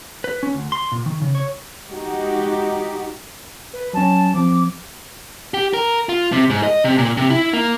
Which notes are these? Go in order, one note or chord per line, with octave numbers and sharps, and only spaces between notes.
B4
C#4
D2
C6
A#2
D#3
C#3
C#5
G#3 D#4 F#4 G4
B4
F#3 C#4 A5
F3 C4 D6
G4
A#4
F4
C3
G#2
D#5
C3
A#2
C3
E4
A#3